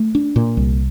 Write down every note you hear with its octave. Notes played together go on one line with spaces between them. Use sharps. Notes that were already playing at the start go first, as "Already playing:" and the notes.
Already playing: A3
D4
A#2
C2